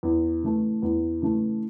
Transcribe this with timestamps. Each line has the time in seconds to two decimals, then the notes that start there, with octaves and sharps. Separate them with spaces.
0.03 E2
0.43 C#3 E3 A3
0.82 E2
1.22 C#3 E3 A3